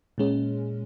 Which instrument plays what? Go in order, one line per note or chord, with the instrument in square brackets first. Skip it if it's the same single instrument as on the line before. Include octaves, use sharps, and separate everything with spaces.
[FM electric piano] A#2 G#3 C#4